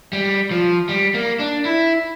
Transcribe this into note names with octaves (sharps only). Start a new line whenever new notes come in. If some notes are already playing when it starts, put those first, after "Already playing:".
G3
F3
G3
A#3
D4
E4